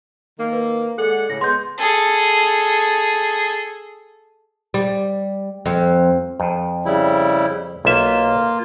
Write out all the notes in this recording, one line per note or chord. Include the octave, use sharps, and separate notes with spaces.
D#3 A#3
B4
G#3 A4 D5 F#5
A2 C#3 A#6
G#3 B3 C6 G6
G#4 A4
G3
F2
F2
C#3 G3 E4
B1 A#3 F4 E5